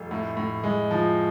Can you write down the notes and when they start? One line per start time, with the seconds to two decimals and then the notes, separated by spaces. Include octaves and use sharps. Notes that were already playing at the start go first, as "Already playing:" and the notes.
Already playing: F1
0.11 A2
0.37 A2
0.64 G#3
0.91 F3